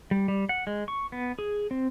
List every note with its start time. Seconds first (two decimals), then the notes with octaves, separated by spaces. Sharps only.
0.11 G3
0.28 G3
0.49 F#5
0.67 G#3
0.88 C#6
1.12 B3
1.39 G#4
1.71 C4